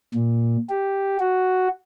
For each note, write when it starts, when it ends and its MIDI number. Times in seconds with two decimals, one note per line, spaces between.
0.15 0.57 46
0.70 1.17 67
1.20 1.68 66